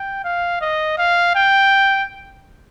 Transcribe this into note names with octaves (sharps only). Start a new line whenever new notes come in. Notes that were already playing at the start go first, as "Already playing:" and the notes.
Already playing: G5
F5
D#5
F5
G5